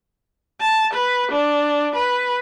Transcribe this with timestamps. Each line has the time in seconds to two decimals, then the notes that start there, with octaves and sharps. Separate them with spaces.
0.61 A5
0.94 B4
1.32 D4
1.95 B4